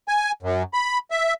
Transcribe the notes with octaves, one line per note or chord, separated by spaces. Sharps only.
G#5
F#2
B5
E5